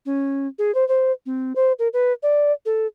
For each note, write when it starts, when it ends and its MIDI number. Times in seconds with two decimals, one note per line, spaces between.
0.06 0.47 61
0.59 0.74 68
0.75 0.87 72
0.88 1.12 72
1.26 1.53 60
1.56 1.72 72
1.79 1.88 70
1.93 2.13 71
2.23 2.52 74
2.66 2.87 69